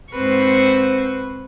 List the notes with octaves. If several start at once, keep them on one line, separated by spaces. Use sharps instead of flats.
G#2 C4 B4 C5 C#6